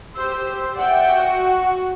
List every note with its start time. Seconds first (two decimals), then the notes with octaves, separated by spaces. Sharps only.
0.15 G4 C5 E6
0.76 D5 E5 F#5 G5
1.10 F#4